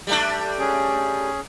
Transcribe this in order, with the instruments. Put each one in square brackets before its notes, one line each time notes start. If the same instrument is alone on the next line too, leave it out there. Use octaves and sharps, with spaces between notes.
[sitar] G3 A3 D4
[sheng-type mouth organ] C#4 G#4